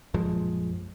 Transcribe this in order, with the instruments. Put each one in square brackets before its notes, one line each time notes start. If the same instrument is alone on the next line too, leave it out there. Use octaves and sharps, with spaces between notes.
[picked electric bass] A#1 F#2 F3 G#3